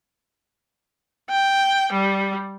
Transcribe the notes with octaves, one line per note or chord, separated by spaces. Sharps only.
G5
G3